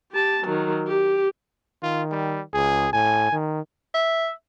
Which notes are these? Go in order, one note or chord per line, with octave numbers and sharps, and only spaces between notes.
G4 A5
D#3 F#3
G4
D#3 F4
G3
C#2 G#4
A2 G#5
D#3
E5